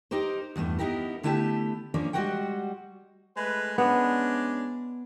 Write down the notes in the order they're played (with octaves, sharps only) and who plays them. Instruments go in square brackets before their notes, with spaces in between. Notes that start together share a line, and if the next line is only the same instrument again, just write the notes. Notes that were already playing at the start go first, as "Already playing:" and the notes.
[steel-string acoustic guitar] D#4 G4 A#4 C5
E2 G2 G#3 A3
B3 D#4 E4 G4 A#4
D3 A3 E4 G4 G5 A5
F3 A#3 C#4 D4
G3 G#3 F#4 A#4 F#5 G5
[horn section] G#3 A3 B4
[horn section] G#3 C#4 D4 [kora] B3